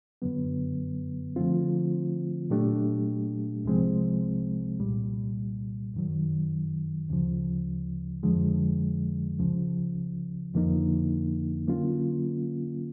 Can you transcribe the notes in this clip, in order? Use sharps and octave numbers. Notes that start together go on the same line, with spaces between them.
F#2 D3 F#3 B3
D3 F3 A3 C4 F4
A#2 F#3 A3 D4 G4
C2 C3 F3 G#3 C4
C2 A#2 G3
F#2 D#3 F#3
D2 C#3 F3
F2 D3 F3 G#3
C#2 C#3 F3
F2 D3 F3 A#3 D#4
D3 F#3 A#3 C#4 F4